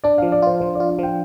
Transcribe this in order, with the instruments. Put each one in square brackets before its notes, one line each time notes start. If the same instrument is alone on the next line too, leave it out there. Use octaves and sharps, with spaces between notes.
[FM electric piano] D4 [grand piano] D5
[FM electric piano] F3 [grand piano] F5
[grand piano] D5
[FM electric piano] F4 [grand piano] C5
[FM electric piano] F3 [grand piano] C5
[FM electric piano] F4 [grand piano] D5
[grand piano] F5
[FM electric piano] F3 [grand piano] G5